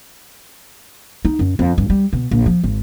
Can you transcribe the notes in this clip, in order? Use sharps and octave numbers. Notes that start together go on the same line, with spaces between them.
D#4
F#2
F2
G2
G3
B2
A#1
F3
G#1